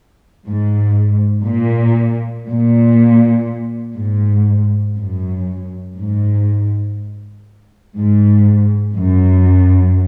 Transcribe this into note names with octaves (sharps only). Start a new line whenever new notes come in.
G#2
A#2
A#2
G#2
F#2
G#2
G#2
F#2